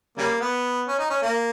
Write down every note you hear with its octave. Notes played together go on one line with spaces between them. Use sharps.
C#3 G3 A#3
B3
C#4
D#4
C#4
A#3